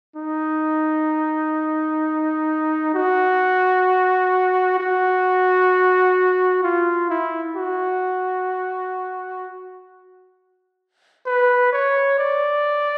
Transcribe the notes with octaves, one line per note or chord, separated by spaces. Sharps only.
D#4
F#4
F#4
F4
E4
F#4
B4
C#5
D5